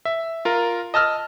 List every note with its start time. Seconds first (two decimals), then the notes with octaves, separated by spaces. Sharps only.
0.05 E5
0.45 F4 A#4
0.94 D#5 A5 E6 F6